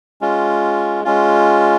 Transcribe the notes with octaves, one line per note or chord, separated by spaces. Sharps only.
G#3 C#4 F4
G#3 C#4 F4